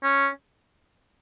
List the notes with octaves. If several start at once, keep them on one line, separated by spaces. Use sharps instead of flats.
C#4